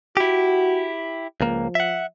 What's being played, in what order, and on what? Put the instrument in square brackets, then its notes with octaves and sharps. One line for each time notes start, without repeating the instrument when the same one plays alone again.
[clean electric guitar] E4 G4 [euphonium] F#4
[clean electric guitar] C#2 A#3 [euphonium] F3
[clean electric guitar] E5 F#5